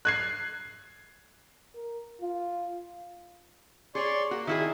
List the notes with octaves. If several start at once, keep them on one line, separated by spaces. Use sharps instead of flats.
F#6 G#6 C7
A#4
F4
G#4 C#5 D5 C6 C#6
A#3 F#4
D#3 E4 G#4 E5